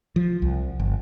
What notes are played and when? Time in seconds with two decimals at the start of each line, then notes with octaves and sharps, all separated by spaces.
0.16 F3
0.42 C2
0.80 G1